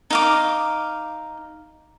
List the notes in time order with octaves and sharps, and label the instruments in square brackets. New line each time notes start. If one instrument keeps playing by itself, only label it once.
[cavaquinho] D#4 F5 D6